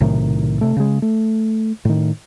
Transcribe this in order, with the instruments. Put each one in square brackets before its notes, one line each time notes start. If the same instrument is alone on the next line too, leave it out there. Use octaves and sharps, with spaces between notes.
[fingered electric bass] B1 A2 C3 D#3
C3 A3
C#3 G#3
A3
A2 D#3